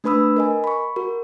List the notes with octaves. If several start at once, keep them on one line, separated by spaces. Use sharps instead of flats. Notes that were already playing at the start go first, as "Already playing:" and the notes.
A3 D4 B4 B5 D#6 E6
A#4 D#5 G#5
B5 C#6
F#4 A#4